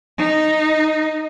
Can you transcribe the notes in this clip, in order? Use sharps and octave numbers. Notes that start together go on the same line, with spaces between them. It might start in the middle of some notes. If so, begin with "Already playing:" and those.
D#4